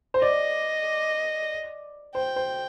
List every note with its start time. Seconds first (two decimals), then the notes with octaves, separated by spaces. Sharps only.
0.14 C5
0.21 D5 D#5
2.15 C5 G5
2.36 C5